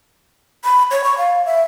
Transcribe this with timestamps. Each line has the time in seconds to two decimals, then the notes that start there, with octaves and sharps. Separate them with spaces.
0.64 B5
0.91 C#5
1.04 C#6
1.18 F5
1.45 E5